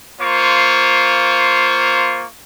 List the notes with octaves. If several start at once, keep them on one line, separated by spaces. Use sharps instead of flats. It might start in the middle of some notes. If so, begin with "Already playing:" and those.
A#3 F4 C5 C#6